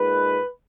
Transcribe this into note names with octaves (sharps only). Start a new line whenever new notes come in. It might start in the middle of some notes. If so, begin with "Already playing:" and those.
Already playing: A#2 G#3 D#4 B4